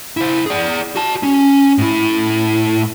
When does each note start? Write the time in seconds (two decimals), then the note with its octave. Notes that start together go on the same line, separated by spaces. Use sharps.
0.17 E4 C5
0.46 G#4 D5
0.96 F#4 A5
1.23 C#4
1.78 A2 E4